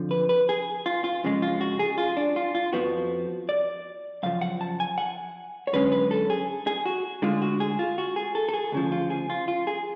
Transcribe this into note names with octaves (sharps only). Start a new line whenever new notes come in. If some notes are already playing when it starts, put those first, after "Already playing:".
Already playing: F2 D3 F3
B4
B4
G#4
F4
F4
F2 C#3 G#3
F4
F#4
G#4
F4
D4
F4
F4
F2 F3 B3 F#4
D5
F#2 C#3 F3 F5
F#5
A5
G#5
F#5
C#5
F#2 D3 G#3 C#4 B4
B4
A4
G#4
G#4
F#4
D2 D3 G#3 F4
F#4
G#4
F4
F#4
G#4
A4
A4
G#4
D2 C#3 F3
F4
G#4
F4
F4
G#4